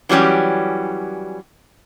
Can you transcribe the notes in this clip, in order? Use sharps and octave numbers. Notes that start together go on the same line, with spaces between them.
E3 F#3 G3 C#4 G4